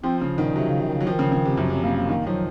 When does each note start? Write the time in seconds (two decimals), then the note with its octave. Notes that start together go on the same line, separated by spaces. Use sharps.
0.03 F3 C4
0.21 C#3
0.38 G#2 D#3
0.43 A#2
0.55 C3 F#3
0.68 C#3
0.81 C3
0.88 D#3
0.93 C#3
1.00 F#3
1.06 D#3 F3
1.19 C#3
1.32 C#3
1.45 C3
1.57 F#2
1.70 C3 F#3
1.83 C#3 A#3
1.97 A#3
2.08 D#3 A#3
2.26 F3 F#3